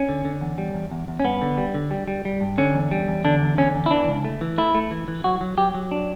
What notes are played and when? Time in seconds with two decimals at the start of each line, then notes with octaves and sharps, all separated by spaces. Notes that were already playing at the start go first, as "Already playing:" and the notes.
Already playing: C#4
0.09 D3
0.25 D3
0.41 E2
0.58 G3
0.74 E2
0.91 E2
1.08 E2
1.20 C#4
1.24 G2 B3
1.42 D3
1.58 G3
1.74 D3
1.91 G3
2.08 G3
2.25 G3
2.41 G2
2.58 D3 C#4
2.74 E2
2.91 G3
3.08 E2
3.25 D3 D4
3.42 E2
3.58 D3 C#4
3.75 E2
3.86 E4
3.91 E3 D4
4.08 C#2
4.25 A3
4.41 E3
4.58 A3 E4
4.75 A3
4.91 E3
5.08 E3
5.24 F#3 F#4
5.41 F#3
5.58 F#3 G4
5.74 F#3
5.91 D4